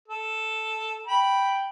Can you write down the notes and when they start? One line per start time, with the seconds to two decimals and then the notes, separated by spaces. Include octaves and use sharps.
0.08 A4
1.06 G5 B5